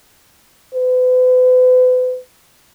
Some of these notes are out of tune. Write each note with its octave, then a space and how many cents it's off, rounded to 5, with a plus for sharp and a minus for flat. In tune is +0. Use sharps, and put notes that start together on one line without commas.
B4 +40